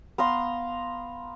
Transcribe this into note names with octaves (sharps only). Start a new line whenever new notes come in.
B3 F5 A#5 C6